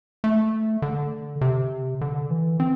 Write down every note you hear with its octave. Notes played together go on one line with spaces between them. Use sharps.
A3
D3
C3
D3
E3
C4